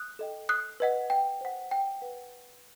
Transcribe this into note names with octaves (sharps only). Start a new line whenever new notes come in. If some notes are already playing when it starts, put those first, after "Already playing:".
Already playing: D#6 F#6
A4 D#5 G5
D#6 F#6
B4 D#5 F#5
G5
C5 F#5
G5
B4 F#5